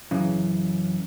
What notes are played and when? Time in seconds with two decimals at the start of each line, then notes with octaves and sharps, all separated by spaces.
0.11 F#2 C#3 E3